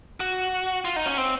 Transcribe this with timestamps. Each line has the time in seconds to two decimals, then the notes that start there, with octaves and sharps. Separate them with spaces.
0.20 F#4
0.85 F4
0.96 D#4
1.06 C#4
1.18 C4